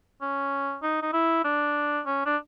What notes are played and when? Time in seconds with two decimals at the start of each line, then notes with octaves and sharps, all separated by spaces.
0.21 C#4
0.82 D#4
1.02 D#4
1.13 E4
1.44 D4
2.06 C#4
2.26 D4